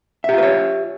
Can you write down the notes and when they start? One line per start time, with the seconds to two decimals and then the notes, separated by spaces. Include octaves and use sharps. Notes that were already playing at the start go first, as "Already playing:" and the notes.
0.24 E5
0.29 G4
0.33 F4
0.38 B4
0.43 C#5